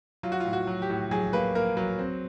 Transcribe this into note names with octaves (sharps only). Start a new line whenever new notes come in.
F#3 F4
F#4
A2 F4
F#4
F#3
G4
A2
F#3 G#4
A#3 B4
A#3 A#4
F#3 A#4
C4